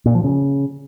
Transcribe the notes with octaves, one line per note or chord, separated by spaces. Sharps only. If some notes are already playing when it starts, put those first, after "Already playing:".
A#2
F3
C#3